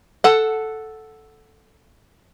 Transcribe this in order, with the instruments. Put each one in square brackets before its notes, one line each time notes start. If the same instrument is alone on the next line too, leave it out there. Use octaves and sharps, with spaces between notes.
[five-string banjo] A4 F#5